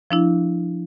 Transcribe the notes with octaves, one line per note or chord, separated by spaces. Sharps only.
F3 D4 E4